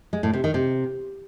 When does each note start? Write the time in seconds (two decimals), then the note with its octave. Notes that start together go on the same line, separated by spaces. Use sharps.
0.13 G#3
0.23 A2
0.33 C3
0.44 D#3
0.54 C3